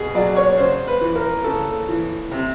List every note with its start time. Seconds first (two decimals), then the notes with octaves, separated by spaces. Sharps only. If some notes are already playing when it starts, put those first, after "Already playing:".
Already playing: B2 G#4
0.15 F#3 D5
0.36 C#5
0.57 C#3 C5
0.88 B4
1.01 E3
1.15 A#4
1.44 C#3 A4
1.89 E3
2.31 C3